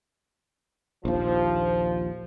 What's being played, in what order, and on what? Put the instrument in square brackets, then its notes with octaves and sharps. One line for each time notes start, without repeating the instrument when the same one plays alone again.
[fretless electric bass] A#1 D#2 [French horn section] F3